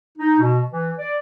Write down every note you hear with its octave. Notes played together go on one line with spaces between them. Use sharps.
D#4
B2
E3
D5